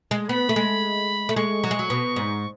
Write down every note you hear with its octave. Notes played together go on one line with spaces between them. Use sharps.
G#3
B3 B5
A3
G#3
A3
G#3 C#6
F#3
G#3
F#3
B2
G#2